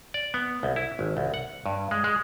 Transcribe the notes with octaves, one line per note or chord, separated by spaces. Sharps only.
D5
B3
C2
E4
G#1
C2
F#5
G2
G#3
G#3